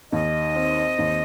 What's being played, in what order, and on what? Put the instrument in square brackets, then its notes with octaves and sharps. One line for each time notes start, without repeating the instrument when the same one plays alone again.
[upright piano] D#2 [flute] D#5
[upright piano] C4
D#2